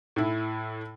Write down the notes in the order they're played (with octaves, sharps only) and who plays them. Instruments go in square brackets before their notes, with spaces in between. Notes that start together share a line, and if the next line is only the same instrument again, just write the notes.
[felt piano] A2 E4